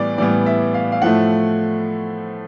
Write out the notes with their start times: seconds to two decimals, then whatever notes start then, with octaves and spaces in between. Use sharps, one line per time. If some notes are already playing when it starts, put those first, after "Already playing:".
Already playing: A2 E3 G3 B3 D5
0.18 A2 E3 G3 B3 D5
0.46 E5
0.74 F5
0.92 F5
1.02 A2 F3 A3 F#5